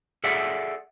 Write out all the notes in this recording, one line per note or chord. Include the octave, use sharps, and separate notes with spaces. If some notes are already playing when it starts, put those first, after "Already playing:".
G#4 A4 D5 E5 F#5